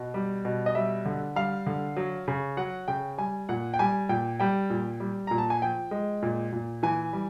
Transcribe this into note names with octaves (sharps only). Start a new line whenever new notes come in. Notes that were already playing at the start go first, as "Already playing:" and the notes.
Already playing: B2
G3
B2
D#5
G3 E5
D3
G3 F5
D3
F#3
C#3
F#3 F#5
C#3 G5
G3 G#5
A#2 F#5
G5
G3 G#5
A#2 G5
G3 G5
A#2
G3
A#2 A#5
A5
G#5
F3 G5
G#3
A#2
A#2
E3 G#5
G3